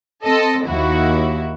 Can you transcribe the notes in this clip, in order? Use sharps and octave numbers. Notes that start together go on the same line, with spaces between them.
C4 A4 D#5
D#2 E4 F#4